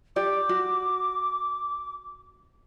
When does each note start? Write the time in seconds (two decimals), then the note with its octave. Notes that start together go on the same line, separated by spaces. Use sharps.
0.16 G4 D5 D6
0.49 F#4